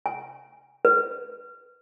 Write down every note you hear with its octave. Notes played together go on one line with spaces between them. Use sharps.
G#5
B4